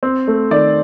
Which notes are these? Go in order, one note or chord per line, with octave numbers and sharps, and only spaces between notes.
C4
A3
D#3 D5